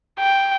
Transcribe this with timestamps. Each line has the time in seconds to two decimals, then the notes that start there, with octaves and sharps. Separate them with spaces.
0.19 G5